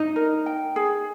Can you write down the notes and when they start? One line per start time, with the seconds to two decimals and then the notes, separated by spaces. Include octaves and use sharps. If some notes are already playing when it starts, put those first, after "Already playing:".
Already playing: D#4 D#5
0.16 A#4
0.46 G5
0.76 G#4